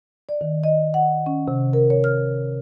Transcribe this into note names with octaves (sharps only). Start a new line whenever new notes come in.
D5
D#3
D#5
F#5
C#4
C3
A#4
C#5
F6